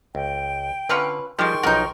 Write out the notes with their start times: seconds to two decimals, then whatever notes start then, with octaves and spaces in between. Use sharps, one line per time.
0.15 C#2 G5
0.89 D3 C#4 F4 B4
1.39 D#3 F3 G3 G#3 G5 C6 C#6
1.63 B1 F3 D#4 F#4 A#4